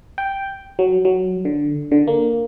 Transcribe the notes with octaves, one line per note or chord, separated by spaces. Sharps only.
G5
F#3
F#3
D3
D3
A#3